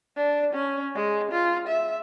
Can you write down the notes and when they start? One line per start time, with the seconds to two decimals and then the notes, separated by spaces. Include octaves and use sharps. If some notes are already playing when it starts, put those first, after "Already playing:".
0.17 D4
0.54 C#4
0.95 G#3
1.32 F4
1.68 E5